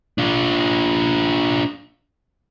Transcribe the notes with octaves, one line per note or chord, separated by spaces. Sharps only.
D4 F4